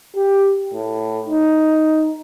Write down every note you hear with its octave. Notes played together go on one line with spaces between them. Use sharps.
G4
A2
D#4